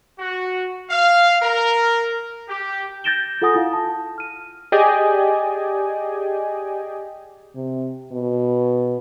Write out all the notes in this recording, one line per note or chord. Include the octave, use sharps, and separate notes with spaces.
F#4
F5
A#4
G4
G6 A6 A#6 D7 E7 G7
F4 A4 F#5 G#5 D#6 A#6
E4 F4 F5
A5
F6 D#7
G4 G#4 D5 D#5 G5 G#5
C3
B2